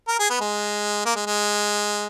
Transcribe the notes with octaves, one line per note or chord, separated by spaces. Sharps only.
A#4
G#4
B3
G#3
A#3
G#3
G#3